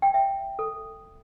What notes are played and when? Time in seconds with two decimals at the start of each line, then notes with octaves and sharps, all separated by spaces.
0.02 G5
0.14 E5
0.59 A4